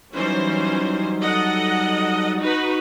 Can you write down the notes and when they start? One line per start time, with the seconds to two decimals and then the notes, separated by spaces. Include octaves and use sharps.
0.14 E3 F#3 G3 C#4 D#4 C5
1.21 A4 D#5 F#5
2.40 D#4 F#4 B4